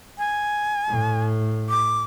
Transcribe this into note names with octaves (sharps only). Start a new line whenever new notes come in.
G#5
A2
D6